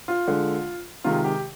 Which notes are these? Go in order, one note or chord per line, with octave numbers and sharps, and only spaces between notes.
F4
D3 G#3
C3 D#3 G#3 F4
G4